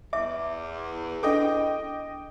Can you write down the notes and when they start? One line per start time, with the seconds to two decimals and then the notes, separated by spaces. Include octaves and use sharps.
0.13 E2 E5 D6
1.23 D4 A4 D#5 G5 D6